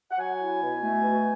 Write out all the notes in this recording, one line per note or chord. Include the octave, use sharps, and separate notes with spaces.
F#5
F#3 G#5
E4
B2
A3
B2